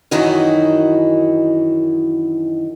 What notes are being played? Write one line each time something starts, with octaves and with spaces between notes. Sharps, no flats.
F#2 D#3 E3 D#4 E4 F#4